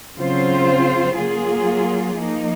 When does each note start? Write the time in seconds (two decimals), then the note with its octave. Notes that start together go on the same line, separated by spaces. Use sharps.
0.16 C#3 F#3 C4 F4 C5
1.16 F#3 A#3 F4 G#4
2.17 F3 A#3 D#4